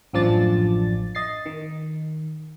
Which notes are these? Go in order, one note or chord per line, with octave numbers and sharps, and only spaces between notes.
A1 F#2 F3 D4 D5 A6
D#5 A6 C7
D#3